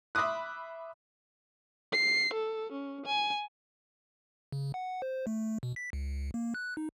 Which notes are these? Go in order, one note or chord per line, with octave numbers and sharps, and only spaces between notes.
E5 B5 C6 D6 D#6 F#6
C7
A4
C#4
G#5
C#3
F#5
C5
A3
B2
B6
C#2
A#3
F#6
D#4